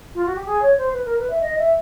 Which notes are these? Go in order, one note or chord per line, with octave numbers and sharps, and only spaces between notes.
F4
F#4
G4
G#4
C#5
C5
B4
A#4
B4
E5
D#5
E5